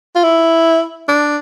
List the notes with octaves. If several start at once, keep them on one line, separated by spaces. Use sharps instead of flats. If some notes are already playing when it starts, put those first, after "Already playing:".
F4
E4
D4